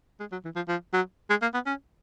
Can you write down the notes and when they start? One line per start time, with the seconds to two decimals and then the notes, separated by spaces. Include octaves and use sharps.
0.20 G#3
0.31 F#3
0.44 E3
0.56 F3
0.68 F3
0.93 F#3
1.30 G#3
1.42 A#3
1.53 B3
1.66 C#4